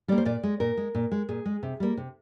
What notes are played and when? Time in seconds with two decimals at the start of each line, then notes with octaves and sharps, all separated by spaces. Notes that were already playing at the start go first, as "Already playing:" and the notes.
0.08 G3 A#3 D5
0.18 C5
0.25 A#2 D5
0.43 G#3
0.60 A#2 A#4
0.77 G#3
0.95 A#2
1.12 G#3
1.29 A#2 G#4
1.45 G#3
1.63 C3
1.80 G3 A#3
1.97 C3